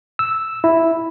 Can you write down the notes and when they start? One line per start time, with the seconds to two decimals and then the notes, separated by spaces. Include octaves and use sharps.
0.19 E6
0.64 E4